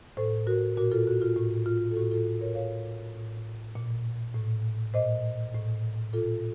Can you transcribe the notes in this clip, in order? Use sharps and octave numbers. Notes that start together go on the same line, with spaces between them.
A2 A4 C5
F#4 A#4
A#2 F#4 A#4
F4 A4
F#4
F4
A2 F#4
F4
A4
A2 F#4
F4 A4
A#4 C#5
A2 C#5 F5
A2
A#2
A2
A#2 C5 D#5
A2
A#2 F4 A4